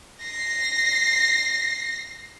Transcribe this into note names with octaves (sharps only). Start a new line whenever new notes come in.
A#6 C7